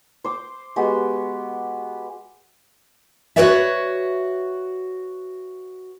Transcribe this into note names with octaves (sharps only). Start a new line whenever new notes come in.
C5 D6
G#3 B3 F#4 G4
F#4 G#4 B4 C#5 D5 E5